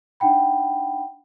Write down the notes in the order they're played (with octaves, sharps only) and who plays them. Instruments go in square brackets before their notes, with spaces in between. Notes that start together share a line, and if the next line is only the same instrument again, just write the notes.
[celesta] D4 D#4 F#5 G5 B5